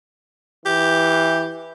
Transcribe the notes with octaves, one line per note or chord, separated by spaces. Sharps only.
E3 G4